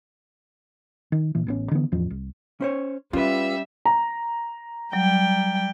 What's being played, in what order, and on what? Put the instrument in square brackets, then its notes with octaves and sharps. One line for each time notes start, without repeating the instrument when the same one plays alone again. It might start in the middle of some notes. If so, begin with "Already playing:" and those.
[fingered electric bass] D#3
A#2 E3
A1 B3 C#4
D3 E3 B3
A1 E2 F3
C2
[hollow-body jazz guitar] C#4 C5 C#5
[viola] G3 E5 [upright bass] C#4 [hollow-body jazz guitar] F4 B4
[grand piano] A#5
[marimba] F#3 [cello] G3 G5